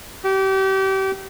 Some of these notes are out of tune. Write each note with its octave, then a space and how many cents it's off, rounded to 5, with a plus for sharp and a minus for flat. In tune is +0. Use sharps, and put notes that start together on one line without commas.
G4 -30